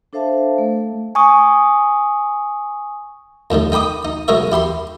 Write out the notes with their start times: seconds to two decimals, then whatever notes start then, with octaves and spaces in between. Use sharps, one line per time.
0.13 D4 A4 C5 E5 F5 A5
0.58 A3
1.15 G#5 C#6 D#6
3.50 F2 A2 D#3 G3
3.72 D#4 G5 B5 D6 D#6
4.05 D#4
4.28 B1 G#3 D#4 A#4 C#5 E5
4.52 E4 G4 B5 C6